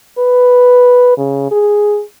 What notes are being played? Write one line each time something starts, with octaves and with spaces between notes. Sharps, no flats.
B4
C#3
G#4